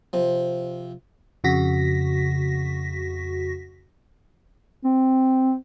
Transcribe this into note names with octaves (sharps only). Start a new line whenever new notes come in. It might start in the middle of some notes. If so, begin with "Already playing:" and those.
C3 F3
F2 C#3 F#4 A#6 B6
C4